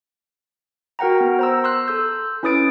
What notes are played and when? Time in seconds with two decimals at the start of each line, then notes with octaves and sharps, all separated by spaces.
0.99 F#4 A#4 F#5 G5 A#5
1.21 B3
1.39 C5 A#5 E6
1.64 C6 E6 F#6
1.88 A4 E6 G6
2.43 C#4 E4 B4 D#6 A6 D7